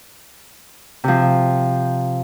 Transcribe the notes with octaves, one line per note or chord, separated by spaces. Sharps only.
C3 F3